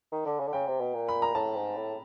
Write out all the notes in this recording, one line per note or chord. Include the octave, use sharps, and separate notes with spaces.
D#3
D3
C#3
D3
C#3 G5
C3
B2
A#2
B5
A#5
A2 A5
G#2
A2